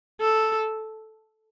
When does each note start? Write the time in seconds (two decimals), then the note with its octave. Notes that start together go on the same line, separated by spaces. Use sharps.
0.21 A4